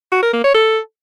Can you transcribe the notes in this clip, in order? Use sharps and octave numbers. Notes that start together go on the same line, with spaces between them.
F#4
A#4
A#3
C#5
A4